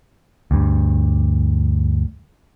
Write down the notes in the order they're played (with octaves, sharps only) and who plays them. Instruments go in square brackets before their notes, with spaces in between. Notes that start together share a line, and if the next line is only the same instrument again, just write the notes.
[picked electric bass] D2 G2